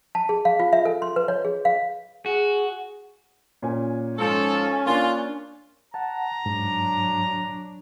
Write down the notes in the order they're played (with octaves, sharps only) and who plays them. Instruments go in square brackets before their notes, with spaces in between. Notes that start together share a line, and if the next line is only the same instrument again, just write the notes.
[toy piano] A5
G#4
F5
F4
E5
A4
C6
B4
C#5
G#4
F5
[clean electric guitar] F#4 [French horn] G#4
[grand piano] A#2 C#4 G#5
[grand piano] G#2 [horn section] F3 F4 A4 [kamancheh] C#4
[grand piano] A#3 D4 [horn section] F4
[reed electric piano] F#5 A5 [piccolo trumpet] A#5
[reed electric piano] G#2 [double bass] F#3 D4